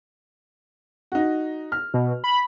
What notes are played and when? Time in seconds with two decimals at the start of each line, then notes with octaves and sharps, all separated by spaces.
1.12 D#4 F#4
1.72 F6
1.94 B2
2.24 B5